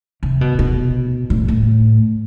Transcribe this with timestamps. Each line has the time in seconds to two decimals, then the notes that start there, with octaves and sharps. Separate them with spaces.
0.23 C3
0.41 B2
0.59 B2
1.30 A2
1.48 A2